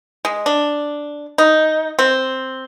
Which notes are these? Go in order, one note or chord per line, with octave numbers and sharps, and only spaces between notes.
G#3
D4
D#4
C4